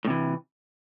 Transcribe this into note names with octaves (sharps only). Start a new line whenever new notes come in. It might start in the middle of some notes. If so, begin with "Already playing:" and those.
A2 C3 E3